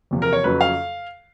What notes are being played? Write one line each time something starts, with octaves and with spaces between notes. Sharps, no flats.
E2 C3 F3
A#4
C#5
F2 C#3 F#3 B4
F5